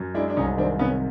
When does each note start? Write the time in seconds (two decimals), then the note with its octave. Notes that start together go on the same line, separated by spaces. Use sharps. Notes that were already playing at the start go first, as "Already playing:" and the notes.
Already playing: F#2
0.14 G#3 D4 E4
0.30 D4
0.37 C2 C#4 D#4
0.57 D#3 C4 D4
0.79 C3 B3 C#4